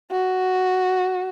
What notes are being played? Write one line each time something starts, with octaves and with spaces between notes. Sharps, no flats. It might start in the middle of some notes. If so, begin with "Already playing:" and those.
F#4